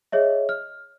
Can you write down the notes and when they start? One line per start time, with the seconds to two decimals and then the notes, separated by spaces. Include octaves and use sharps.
0.12 G#4 C#5 D#5 E5
0.49 F6